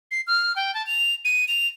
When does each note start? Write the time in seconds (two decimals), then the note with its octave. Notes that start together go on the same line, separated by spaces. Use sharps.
0.11 C7
0.27 F6
0.56 G5
0.74 A5
0.86 F7
1.25 D#7
1.48 F7